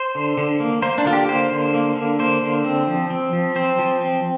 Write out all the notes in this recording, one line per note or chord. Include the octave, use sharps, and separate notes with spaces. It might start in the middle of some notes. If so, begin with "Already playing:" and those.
Already playing: C5
D3
D3
A#3
A#3 C5
D4
D3 F4
G4
A#3 C5
D3
A#3
D3
A#3 C5
D3
C4
F3
C4
F3
C4 C5
F3
C4